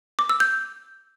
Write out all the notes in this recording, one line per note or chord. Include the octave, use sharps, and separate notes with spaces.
D6
E6
G6